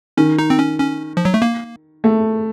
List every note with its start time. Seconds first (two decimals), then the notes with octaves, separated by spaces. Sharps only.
0.17 D#3 C#4
0.39 D#4
0.50 C4
0.59 C#4
0.80 C#4
1.17 F3
1.25 F#3
1.34 A3
1.42 A#3
2.04 A3